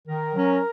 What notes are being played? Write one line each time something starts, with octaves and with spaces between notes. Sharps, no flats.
D#3 A#4
F#3 C#4